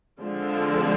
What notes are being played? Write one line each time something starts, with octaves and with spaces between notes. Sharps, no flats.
D3 F3 G#3 C4